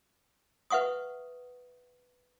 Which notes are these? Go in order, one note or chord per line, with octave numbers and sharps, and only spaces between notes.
B4 E5 F#5 C#6 D#6